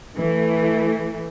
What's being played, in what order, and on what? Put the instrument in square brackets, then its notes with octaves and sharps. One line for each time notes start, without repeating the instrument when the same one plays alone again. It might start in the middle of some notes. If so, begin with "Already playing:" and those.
[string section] E3 A3